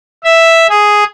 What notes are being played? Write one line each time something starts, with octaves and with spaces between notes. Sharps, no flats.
E5
G#4